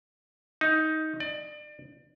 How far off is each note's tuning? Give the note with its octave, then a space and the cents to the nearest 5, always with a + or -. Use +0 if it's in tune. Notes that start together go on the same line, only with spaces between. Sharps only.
D#4 +15
D5 +30